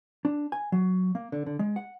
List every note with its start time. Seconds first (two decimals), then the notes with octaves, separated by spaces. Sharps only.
0.25 D4
0.52 G#5
0.72 F#3
1.15 A#3
1.32 D3
1.46 D3
1.59 G#3
1.76 F#5